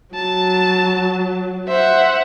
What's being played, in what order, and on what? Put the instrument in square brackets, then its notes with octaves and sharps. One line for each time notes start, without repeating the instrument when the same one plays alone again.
[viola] F#3 [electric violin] A5
[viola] C5 [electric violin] E5 F#5